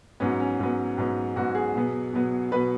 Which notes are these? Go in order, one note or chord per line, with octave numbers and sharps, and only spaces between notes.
G#2 F#3 B3 C#4
C#4
G#2 F#3 B3
G#2 F#3 B3
G#2 F#3 B3 F#4
G#4
B2 F#3 B3
B2 F#3 B3
B2 F#3 B3 B4